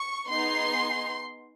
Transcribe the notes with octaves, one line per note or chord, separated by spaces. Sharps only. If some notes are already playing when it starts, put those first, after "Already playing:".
Already playing: C#6
B3 D#4 G#4 C6